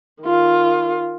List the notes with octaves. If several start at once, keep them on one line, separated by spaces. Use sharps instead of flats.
D#3 F4